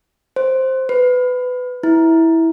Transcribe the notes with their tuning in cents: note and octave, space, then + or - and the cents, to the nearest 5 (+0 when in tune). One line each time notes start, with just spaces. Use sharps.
C5 +5
B4 +20
E4 -10